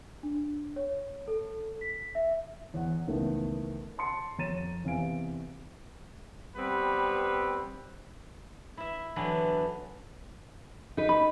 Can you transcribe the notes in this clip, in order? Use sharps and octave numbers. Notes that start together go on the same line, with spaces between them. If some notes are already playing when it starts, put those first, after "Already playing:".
D4
C#5
A4
B6
E5
E2 F#5
C#2 D#3 E3 A3 B3
F#5 A5 C6 C#7
F2 C#5 A#5 A6 D#7 E7
E2 C3 B3 F5 G#5 D7
G3 B3 C4 B4
E4 E5
D3 E3 F#3 B3 D4
D#4 B4
B5